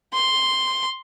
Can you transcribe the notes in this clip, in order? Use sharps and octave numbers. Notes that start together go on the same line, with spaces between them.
C6